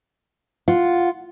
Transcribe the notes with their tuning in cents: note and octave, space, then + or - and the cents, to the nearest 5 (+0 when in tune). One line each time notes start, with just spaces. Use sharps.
F4 +0 F#5 +0